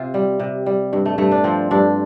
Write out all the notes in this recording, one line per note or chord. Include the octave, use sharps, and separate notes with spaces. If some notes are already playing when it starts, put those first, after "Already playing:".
Already playing: C3 F4
G3
C3
G3
G2
A3
G2 A3
D4
F3 C4
G2 D4